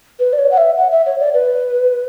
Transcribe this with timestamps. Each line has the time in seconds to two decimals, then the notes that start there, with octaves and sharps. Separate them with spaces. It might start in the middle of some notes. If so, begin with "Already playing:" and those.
0.19 B4
0.33 D5
0.39 C#5
0.51 F#5
0.58 E5
0.77 F#5
0.92 E5
1.06 C#5
1.20 D5
1.34 B4